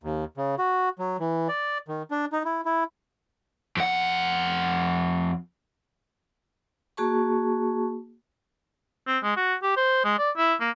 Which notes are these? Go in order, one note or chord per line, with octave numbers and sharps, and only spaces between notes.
D#2
C#3
F#4
F#3
E3
D5
D#3
D4
D#4
E4
E4
F2 F#5
A#3 F#4 G#4 A5 C#6
C4
G#3
F#4
G4
C5
G#3
D5
E4
A#3